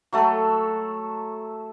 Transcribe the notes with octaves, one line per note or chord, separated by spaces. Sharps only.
F#3 A3 A4